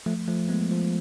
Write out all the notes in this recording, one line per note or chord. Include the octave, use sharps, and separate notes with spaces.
F3 A3
F3 A3
G#3 B3
F3